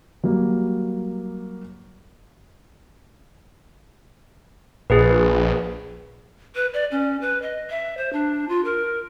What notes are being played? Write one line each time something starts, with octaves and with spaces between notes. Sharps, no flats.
F#3 G3 A#3
A#1 G#4 B4
B4
D5
C#4
B4
D#5
E5
C5
D4
F4
A#4